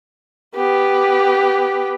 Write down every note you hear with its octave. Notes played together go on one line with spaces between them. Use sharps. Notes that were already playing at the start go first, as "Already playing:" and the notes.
B3 G4